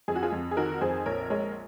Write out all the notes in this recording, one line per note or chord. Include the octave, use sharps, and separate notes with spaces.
F2 G#4
F#4
F4 G#4
F2
G#4
D#3 F#4 A#4
F2 G#4 C5
A#1 A#4 C#5
G#3 A#4 C#5